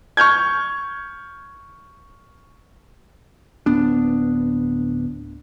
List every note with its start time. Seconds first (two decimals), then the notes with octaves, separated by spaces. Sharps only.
0.17 C#6 F6 G6 G#6
3.66 D1 B3 D4